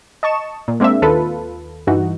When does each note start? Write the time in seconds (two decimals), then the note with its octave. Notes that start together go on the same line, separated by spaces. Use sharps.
0.23 D#5 A5 C#6 E7
0.68 A#2
0.80 G#3 A#3 C4 D4 E5
1.02 D#2 F4 A4 B4
1.87 G2 E3 D#4 F#4